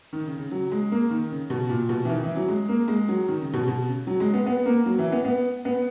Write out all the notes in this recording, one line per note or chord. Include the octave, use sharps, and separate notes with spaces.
D#3
C#3
C#3
F#3
G#3
A#3
D#3
C#3
B2
A#2
B2
E3
D#3
E3
F#3
G#3
A#3
G#3
F#3
D#3
C#3
B2
B2
C#3
F#3
G#3
B3
B3
A#3
F#3
E3
B3
B3
B3